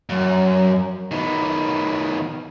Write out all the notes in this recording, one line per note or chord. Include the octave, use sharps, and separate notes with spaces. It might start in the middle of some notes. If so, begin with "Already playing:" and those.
F#2
D#3 B3